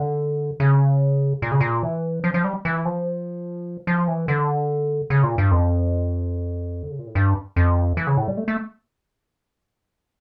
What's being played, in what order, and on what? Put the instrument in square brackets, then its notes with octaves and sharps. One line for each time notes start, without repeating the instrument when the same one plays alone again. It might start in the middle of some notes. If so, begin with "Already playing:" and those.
Already playing: [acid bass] D3
C#3
A#2
C#3
A#2
E3
F3
F3
G3
E3
F3
F3
E3
D3
C#3
A#2
G2
F2
D3
C#3
A#2
A2
G2
F2
E3
C#3
A2
G3
A3
A3